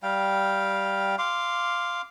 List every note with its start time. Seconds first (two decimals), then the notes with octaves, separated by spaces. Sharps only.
0.03 G3 F5 G5
1.18 F5 C6 D6